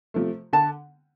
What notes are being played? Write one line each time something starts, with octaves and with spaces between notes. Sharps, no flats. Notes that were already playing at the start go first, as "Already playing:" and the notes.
C3 F3 A3
D3 A5